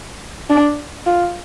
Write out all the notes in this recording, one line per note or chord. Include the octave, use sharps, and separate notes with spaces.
D4
F4